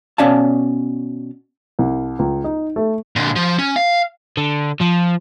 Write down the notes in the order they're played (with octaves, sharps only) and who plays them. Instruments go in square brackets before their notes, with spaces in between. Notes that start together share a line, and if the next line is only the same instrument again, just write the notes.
[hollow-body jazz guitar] B2 C#4 D5 F5 A5
[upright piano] C2
C#2
D#4
A3
[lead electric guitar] A#2 D3
F3
C#4
F5
[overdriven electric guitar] D3
F3